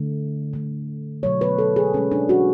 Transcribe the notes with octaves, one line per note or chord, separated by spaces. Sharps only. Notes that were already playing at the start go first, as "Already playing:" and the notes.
Already playing: D3 A3
D3 A3
B2 F#3 A3 C#5
B4
A4
G#4
B2 G#3 C#4
D4
F#4